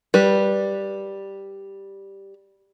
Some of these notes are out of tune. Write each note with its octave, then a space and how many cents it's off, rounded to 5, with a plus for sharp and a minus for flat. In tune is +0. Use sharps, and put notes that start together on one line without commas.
G3 +0 B4 -15